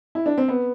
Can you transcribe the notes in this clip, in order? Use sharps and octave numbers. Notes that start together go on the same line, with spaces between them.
E4
D4
C4
B3